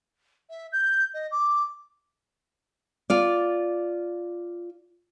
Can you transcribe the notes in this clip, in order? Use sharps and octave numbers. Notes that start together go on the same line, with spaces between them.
E5
G6
D#5
D6
F4 D5